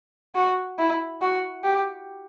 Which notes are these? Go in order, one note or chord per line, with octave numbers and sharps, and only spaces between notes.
F#4
E4
F#4
G4